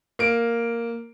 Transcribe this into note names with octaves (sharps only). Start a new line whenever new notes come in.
A#3 D7